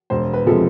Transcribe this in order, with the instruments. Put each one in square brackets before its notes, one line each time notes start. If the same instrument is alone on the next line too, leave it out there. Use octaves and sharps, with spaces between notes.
[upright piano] E1 C5
B4
C3 F3 G#3 A4